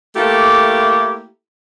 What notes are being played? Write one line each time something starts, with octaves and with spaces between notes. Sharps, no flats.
A3 A#3 E4 G4 A4